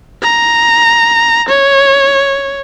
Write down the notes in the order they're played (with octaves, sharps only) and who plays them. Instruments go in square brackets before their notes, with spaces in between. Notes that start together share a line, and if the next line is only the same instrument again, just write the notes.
[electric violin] A#5
C#5